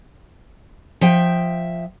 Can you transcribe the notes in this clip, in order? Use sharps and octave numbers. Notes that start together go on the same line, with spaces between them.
F3 E5 G5